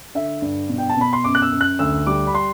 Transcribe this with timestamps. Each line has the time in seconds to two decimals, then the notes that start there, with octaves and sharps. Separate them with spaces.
0.15 D3 E5
0.42 G2
0.69 B2
0.78 G5
0.90 A5
0.97 B2 B5
1.13 C6
1.24 F#2 D6
1.35 F#6
1.42 E6
1.52 F#2
1.61 F#6
1.79 D2 E6
2.06 G3 D6
2.27 B5
2.35 C6